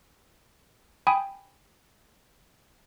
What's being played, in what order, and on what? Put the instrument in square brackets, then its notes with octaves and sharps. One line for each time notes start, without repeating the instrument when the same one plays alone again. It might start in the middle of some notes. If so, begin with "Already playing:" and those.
[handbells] G5 G#5 B5 D#6